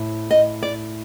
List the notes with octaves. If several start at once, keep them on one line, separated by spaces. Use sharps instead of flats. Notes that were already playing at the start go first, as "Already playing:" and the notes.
Already playing: A2
D#5
D5